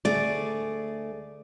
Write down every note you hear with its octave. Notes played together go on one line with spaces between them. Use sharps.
D2 A3 G#4 D5